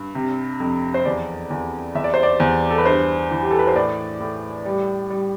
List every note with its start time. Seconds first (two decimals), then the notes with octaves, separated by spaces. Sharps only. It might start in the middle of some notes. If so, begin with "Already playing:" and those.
Already playing: G2
0.15 C3
0.60 F2
0.94 C5
1.06 E2 D5
1.50 E2
1.95 E2 E5
2.04 D5
2.14 C5
2.23 D5
2.40 E2
2.71 A4
2.78 B4
2.85 G2 C5
3.31 E3
3.42 G4
3.51 A4
3.59 B4
3.67 C5
3.75 A2 D5
4.20 A2
4.65 G3
5.10 G3